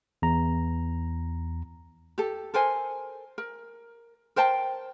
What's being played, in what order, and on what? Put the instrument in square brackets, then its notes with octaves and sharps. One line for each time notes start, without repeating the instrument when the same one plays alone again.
[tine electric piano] E2 A#5
[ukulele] G4 A4
A4 A#4 C5 G#5
A#4
A#4 C5 G5 A5